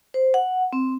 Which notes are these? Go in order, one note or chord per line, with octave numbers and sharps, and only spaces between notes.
C5
F#5
C4